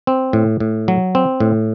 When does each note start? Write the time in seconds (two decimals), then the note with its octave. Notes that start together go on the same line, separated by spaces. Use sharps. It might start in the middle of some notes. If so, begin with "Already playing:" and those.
0.07 C4
0.33 A2
0.60 A2
0.88 F#3
1.15 C4
1.40 A2